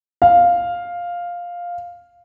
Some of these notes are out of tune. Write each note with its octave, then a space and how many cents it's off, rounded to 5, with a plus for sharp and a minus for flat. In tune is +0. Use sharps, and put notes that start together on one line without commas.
F5 +5